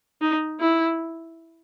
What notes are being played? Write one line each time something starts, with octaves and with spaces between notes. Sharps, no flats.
D#4
E4